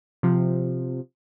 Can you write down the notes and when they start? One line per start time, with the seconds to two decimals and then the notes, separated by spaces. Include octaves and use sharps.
0.23 C3 F3